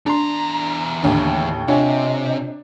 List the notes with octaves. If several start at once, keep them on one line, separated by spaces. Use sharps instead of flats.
E2 D4 A5 A#5 C6
A1 D#2 D3
C3 D4 F4 C#5 D#5 G#5